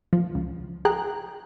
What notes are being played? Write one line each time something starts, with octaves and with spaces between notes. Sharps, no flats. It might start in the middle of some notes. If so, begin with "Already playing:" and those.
F3
C#2
G#4 G5 A#5 F#6